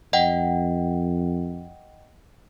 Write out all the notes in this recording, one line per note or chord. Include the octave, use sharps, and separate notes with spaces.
F2 D#5 F#5 G5